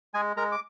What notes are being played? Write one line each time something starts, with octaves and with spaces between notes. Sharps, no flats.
G#3 G#4 G#5
G#3 A#4 A#5
D6